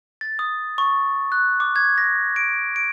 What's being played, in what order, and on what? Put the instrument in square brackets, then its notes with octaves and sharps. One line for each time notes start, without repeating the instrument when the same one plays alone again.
[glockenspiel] A6
D#6
C#6
F#6
D6
G#6
A#6
D7
D7